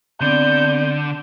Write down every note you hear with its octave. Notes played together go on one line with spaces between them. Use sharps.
D3 B3 C4 D5 G6